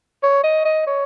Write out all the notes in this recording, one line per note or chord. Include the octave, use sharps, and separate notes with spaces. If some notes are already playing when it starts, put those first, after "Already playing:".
C#5
D#5
D#5
C#5